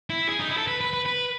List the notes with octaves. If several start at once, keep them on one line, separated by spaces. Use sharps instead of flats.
E4
G#4
D#4
E4
A4
B4
B4
B4
B4